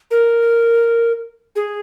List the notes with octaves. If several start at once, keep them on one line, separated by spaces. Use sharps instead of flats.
A#4
G#4